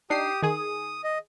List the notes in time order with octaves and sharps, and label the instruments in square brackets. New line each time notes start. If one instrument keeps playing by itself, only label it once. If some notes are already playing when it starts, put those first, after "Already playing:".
[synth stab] D4 D#4 C7 [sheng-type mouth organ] G4 D#6
[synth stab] D#3 G#4 [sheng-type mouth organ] D#6
[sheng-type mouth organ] D#5